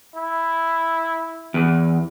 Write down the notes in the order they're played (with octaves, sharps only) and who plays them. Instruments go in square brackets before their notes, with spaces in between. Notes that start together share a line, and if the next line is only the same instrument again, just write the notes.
[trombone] E4
[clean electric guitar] E2